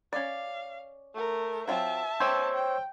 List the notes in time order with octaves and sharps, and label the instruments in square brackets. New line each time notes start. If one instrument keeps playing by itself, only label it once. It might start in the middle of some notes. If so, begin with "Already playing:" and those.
[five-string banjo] C#4 D5 [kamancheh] F5
[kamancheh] A3 A#4
[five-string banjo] F#3 C4 F4 [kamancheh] E5 A5
[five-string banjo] G4 [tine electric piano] C5 C#5 E6
[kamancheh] G5